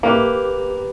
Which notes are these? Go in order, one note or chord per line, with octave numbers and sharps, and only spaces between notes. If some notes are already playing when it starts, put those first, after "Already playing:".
A#3 G4 B4